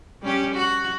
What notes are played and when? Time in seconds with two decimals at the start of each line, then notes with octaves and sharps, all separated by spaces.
0.23 G3 C#4 G4
0.55 F#4